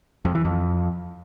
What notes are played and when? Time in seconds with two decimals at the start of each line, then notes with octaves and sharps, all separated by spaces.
0.25 F2
0.35 E3
0.45 F2